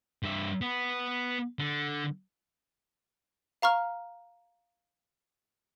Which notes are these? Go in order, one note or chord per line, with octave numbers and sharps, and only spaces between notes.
G2 E5
B3
D3
F5 A#5 C#6 F6